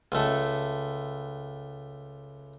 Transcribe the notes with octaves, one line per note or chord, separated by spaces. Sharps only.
C#2 A3